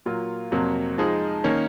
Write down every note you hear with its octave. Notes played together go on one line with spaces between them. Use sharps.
A#2 F#3 A#3 F4
F2 C3 F#3 A#3
F3 G#3 D#4 G#4
D#3 A#3 C#4